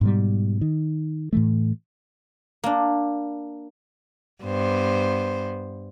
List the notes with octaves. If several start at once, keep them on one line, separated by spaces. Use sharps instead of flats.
G#2 B2 G3
D#3
A2 E3 A3
A#3 D4
G2 B3 C5